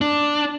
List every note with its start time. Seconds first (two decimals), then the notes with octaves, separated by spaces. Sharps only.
0.01 D4